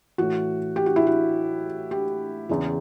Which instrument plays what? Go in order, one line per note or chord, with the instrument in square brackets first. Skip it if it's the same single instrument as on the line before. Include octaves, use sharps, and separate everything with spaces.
[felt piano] A2 E3 F#4
G4
F#4
E4
F#4
G4
E2 C#3 E3